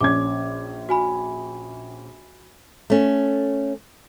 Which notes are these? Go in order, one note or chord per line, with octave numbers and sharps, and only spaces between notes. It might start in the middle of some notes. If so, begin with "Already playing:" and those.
A#1 C#4 D6 G#6
F#4 G#5 B5
A3 C#4